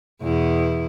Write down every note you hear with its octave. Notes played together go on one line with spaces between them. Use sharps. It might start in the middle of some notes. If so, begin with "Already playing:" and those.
E2 B2 E4